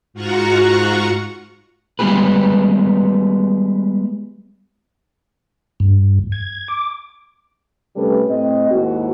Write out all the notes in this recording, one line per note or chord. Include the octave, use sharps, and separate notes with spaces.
G#2 F4 F#4 F#5 A#5 C#6
G3 G#3 B3 G4 G#4 B4
G2
G#6
D6
C3 G3 A3 C#4 A4 B4
A2 C4 D#5
D#2 G#2 A#3 E4 F#4